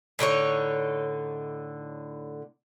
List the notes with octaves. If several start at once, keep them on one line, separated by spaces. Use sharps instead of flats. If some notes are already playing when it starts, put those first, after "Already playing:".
A2 D3 D#4 C#5